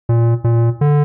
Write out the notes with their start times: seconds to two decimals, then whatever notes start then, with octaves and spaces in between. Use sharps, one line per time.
0.09 A#2
0.44 A#2
0.81 D3